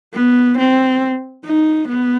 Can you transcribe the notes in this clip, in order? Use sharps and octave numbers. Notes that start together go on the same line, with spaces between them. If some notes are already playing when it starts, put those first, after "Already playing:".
B3
C4
D#4
B3